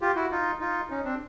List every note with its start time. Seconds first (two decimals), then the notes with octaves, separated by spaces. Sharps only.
0.01 F4 G4
0.16 E4 F#4
0.31 D#4 F4
0.60 D#4 F4
0.90 C#4 D#4
1.04 C4 D4